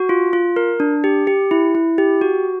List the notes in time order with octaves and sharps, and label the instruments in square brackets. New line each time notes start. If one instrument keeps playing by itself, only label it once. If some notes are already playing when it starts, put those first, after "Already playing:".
Already playing: [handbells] F#4
F4
F4
A#4
D4
G4
G4
E4
E4
G4
F#4